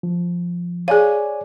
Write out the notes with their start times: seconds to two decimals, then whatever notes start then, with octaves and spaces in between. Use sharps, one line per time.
0.03 F3
0.88 G#4 C#5 D5 F5 G#5